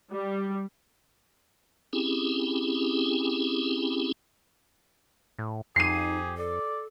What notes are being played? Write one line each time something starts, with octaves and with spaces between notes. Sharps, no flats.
G3
C4 C#4 E4 G4 G#4
A2
F2 D#4 G4 G#4 C7 D#7
A4 D5